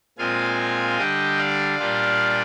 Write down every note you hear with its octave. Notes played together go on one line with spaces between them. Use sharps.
A#2 G#3 C4 F4 F5 G#5
D3 G3 D4 D#5 G5
D5 F5
A#2 G3 D4 F4